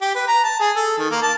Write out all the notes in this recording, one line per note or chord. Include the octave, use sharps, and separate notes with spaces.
G4
B4
A#5
A5
G#4
A4
D#3
A#3
A5